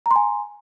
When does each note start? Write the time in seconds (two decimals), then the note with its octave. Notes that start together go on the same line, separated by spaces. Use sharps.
0.06 A#5
0.11 C6
0.16 G#5